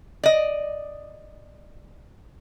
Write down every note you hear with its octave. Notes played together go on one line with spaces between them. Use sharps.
D5 D#5